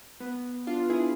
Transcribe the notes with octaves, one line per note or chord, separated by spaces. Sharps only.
B3
D4 F4
E4 G#4